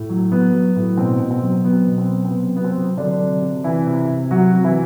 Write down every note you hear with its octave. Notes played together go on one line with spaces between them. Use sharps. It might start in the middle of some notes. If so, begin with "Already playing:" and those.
Already playing: A2
F#3
F#3 B3
F#3
A2
B2 C4
B2
C4
F#3
F#3 B3
B2
C4
F#3
C4
C3 B3
F#3 B3
C4
F#3
D3 F#3 D4
C3
C3
C3 E3 E4
C3
C3
C3 F#3 F#4
C3
E3 E4